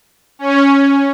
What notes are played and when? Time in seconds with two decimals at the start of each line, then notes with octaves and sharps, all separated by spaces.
0.39 C#4